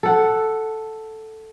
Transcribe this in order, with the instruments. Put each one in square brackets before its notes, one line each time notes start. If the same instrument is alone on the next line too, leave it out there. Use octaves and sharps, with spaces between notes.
[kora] A4 F#5